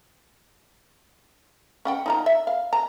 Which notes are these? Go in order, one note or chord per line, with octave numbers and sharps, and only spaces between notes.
C#4 F#5 G5
D#4 F4 A#5
E5
F5
A#5